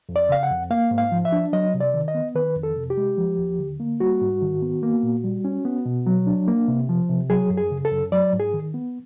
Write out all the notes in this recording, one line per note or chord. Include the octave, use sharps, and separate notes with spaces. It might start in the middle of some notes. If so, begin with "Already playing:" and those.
F2
D5
C#3 F5
F#5
F2
A#3 F5
G#2
F5
F3
E5
D4
F#3 D#5
C3
D5
D#3
D#5
B3
D#3 B4
F2
A4
C3
G4
G#3
F3
D#2
D3
A#3
G3 F#4
G#2
D#3
B3
A#3
A#2
G3
C#4
B3
B2
F#3
D4
A#3
C3
F3
C3
F#3 G#4
F#2
G#4
C#3
A4
F#2
F#3 D5
G#2
G#4
D#3
B3